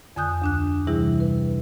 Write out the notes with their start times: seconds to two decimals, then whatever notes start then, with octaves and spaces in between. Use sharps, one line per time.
0.16 F2 D3 G#5 D#6 F#6 G6
0.42 D2 D4 F#6
0.87 C3 E3 G3 E4 G#4
1.20 B4